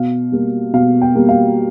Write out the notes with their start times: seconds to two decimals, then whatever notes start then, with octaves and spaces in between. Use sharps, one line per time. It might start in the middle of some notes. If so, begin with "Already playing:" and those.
Already playing: B2 F5
0.32 G3 A#3
0.73 B2 F5
1.01 G5
1.15 G3 A#3
1.29 F5